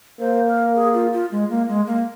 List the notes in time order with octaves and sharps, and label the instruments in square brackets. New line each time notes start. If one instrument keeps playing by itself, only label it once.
[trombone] A#3 [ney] C5
[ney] A#4
G#4
F4
F4
G#3
A#3
G#3
A#3